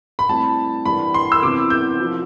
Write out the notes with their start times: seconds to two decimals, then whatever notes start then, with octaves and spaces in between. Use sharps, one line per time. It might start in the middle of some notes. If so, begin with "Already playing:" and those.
0.19 B5
0.29 A2 G3 C4 E4 A5
0.85 E3 G3 D4 B5
1.14 C6
1.32 E6
1.43 C3 E3 B3 E4 D6
1.70 G6
2.00 F3 C4 E4